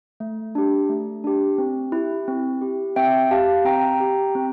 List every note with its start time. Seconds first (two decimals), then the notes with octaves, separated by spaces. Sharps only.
0.20 A3
0.55 D4 G4
0.90 A3
1.24 D4 G4
1.58 C4
1.92 E4 G4
2.28 C4
2.61 E4 G4
2.96 C4 E5 G5
3.31 G4 F5 A5
3.65 C4 G5 A#5
4.00 G4
4.35 C4